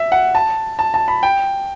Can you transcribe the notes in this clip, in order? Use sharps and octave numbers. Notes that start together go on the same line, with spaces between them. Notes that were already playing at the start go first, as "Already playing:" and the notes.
Already playing: E5
F#5
A5
A5
A5
B5
G5